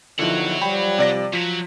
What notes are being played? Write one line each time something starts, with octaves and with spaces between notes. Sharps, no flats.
E2 D3 D#3 F3 E4 C#5 F#5
F3 G3 G5 B5
C3 D5 A#6
F3 F#3 B6